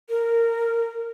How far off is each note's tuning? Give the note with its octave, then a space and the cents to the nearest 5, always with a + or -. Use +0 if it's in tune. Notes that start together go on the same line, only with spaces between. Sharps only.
A#4 -15